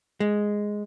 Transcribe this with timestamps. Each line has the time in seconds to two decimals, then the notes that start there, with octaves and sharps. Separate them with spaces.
0.20 G#3